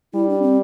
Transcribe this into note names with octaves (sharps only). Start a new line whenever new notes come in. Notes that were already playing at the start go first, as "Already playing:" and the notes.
G3 E4
D4
C4